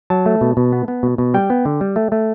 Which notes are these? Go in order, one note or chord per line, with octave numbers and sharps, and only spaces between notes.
F#3 A5
A3
B2
B2
B3
B3
B2
B2
G3 G5
B3
D3
G3
A3
A3